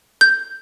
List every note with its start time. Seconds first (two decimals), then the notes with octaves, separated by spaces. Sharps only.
0.21 G6